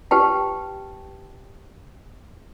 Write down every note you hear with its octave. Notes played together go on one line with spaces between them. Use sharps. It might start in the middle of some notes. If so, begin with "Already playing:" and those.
G4 B4 G5 A5